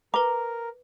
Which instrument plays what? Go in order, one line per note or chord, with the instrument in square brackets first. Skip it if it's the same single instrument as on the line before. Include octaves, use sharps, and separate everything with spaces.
[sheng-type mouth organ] A#4 [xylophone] B4 D6 [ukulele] A#5